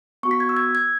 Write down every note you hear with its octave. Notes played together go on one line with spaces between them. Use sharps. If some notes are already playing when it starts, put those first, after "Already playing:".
B3 F#4 C#6
B6
G#6
E6
G#6
G#6